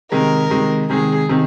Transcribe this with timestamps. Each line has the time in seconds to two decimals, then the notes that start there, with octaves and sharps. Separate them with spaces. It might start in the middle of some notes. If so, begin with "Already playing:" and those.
0.11 C3 D#3 G#3 A#4
0.50 C3 D#3 G#3
0.90 C3 D#3 G#3 G#4
1.29 C3 D#3